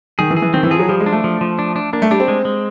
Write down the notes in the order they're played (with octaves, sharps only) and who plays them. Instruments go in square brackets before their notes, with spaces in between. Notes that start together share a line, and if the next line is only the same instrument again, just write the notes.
[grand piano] D#3 [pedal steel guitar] G#4
[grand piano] E3
[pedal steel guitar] G#4
[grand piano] E3
[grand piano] D#3 [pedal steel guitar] C4
[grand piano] E3
[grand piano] F3 [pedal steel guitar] G#4
[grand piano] F#3
[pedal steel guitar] F3 [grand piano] G3
[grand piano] G#3
[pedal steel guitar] D4
[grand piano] A3
[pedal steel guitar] F3
F3
D4
D4
[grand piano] A#3 [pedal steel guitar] D4
[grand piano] A3
[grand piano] G3 [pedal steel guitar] D4
[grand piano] C4
[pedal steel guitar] G#3
G#3